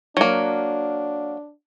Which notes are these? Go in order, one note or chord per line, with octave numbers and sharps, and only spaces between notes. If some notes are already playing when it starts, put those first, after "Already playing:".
F#3 A#3 D4